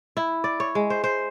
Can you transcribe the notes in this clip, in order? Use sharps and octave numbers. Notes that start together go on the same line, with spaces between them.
E4
D5
C#5
G#3
C5
C5